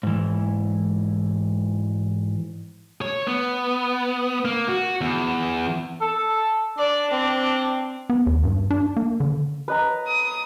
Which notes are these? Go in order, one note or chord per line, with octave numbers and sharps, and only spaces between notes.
G#2 E3
C#5
B3
A#3
F#4
E2
A4
D4 D5
C4
B3
D#2
G2
D4
A#3
D3
B4 D#5 A#5
D#6